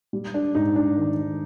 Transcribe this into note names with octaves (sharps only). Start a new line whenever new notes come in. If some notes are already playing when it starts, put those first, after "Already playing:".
G3
D4
G#2 D#4
D4
D#3